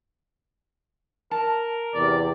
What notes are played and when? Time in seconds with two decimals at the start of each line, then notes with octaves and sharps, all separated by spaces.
1.31 A#4 A5
1.94 E2 C3 D5